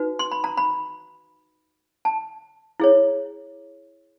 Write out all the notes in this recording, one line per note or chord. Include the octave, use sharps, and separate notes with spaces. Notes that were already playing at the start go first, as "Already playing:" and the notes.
Already playing: D#4 F#4 B4
C6
B5
A#5
B5
A5
E4 G#4 C#5